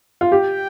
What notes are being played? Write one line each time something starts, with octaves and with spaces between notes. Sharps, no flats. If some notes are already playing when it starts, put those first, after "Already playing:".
F4
G4 G5